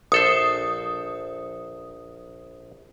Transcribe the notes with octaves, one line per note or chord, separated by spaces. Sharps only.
A#1 A4 C5 D#6